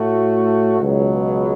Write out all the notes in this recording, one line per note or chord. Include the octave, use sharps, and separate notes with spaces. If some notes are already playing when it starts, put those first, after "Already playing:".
Already playing: A2 A3 F#4
C#2 B2 F#3